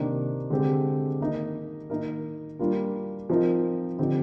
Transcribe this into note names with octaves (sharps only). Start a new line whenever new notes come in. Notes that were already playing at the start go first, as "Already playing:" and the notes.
Already playing: C3 D#3 A#3 D4
D3 G#3 C4 G4
D#3 A#3 D#4
D#3 A#3 D#4 A#4
G3 A#3 D4 F4 A#4
F3 C4 D#4 A#4
D3 F3 C4 D#4 G4